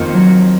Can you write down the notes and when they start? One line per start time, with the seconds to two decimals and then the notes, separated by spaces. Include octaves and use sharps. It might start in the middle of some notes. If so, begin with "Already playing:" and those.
Already playing: F2 D#3 A#3 F4
0.14 F#3